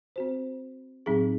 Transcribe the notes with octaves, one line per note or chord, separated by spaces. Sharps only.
C4 F#4 C5
A2 F#3 C4 D#4 G#4